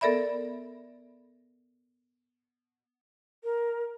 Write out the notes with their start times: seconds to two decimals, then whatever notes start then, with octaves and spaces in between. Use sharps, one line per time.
0.01 B3 A4 A#4 D5 E5 B5
3.44 A#4